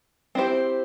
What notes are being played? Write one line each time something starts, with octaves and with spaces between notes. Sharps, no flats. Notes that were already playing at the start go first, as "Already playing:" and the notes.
C4 E4 G4 C5